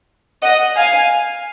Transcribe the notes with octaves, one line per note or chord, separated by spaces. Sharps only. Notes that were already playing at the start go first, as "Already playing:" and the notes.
D#5 F#5
F5 G#5